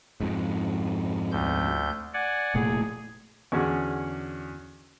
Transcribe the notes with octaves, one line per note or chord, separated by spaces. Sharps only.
F2 G#2
D2 G6
D5 F#5 G#5
F1 A#2 A3 G#4
E2 D3 C#4 F#4 G#4 F#5